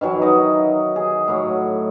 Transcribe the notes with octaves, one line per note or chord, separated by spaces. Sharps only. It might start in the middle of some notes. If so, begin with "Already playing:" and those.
D#3 E3 F#3
D#4 D#5
G#4
A2 F#3